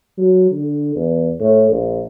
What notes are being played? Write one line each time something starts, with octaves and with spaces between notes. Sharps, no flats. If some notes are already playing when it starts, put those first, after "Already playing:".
F#3
D3
E2
A2
A#1